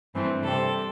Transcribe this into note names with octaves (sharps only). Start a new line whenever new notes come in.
G2 E3 A3 C4
C3 G3 C4 A4